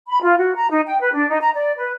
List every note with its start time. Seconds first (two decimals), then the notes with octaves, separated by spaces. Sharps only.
0.08 B5
0.22 F4
0.37 F#4
0.55 A#5
0.70 D#4
0.87 G5
1.00 B4
1.13 D4
1.29 D#4
1.41 A#5
1.54 D5
1.78 B4